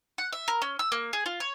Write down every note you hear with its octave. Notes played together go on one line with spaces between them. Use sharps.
F#5
E5
A#4
C#4
E6
A#3
G#4
F4
C#5